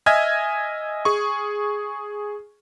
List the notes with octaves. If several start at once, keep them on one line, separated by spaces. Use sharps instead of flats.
D#5 E5 G#5 F6 G#6
G#4 C#6